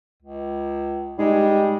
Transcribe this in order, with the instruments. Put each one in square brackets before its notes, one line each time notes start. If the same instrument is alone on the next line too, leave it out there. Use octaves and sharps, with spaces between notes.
[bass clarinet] C#2
[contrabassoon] G#2 [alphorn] G3 [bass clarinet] G#3